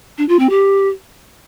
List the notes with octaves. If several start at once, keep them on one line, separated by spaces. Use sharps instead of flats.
D4
F4
C4
G4